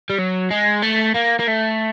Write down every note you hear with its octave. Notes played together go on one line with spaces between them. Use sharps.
G3
F#3
G#3
A3
A#3
A#3
A3